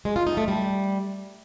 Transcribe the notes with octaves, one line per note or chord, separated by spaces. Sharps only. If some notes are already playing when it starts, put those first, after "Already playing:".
G#3
F4
D#4
A3
G3